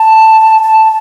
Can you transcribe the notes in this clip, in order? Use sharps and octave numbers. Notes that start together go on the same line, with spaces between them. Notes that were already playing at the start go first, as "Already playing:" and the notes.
Already playing: A5
A5